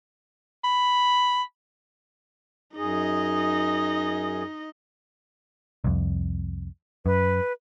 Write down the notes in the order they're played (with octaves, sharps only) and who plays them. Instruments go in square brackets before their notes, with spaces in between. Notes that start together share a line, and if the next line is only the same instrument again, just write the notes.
[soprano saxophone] B5
[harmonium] F#2 G#4 [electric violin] D#4 D#5
[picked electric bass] C2 F2
[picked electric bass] F#2 [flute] B4